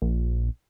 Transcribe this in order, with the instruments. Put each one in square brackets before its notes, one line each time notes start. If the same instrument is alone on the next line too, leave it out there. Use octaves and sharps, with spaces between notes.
[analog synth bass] A#1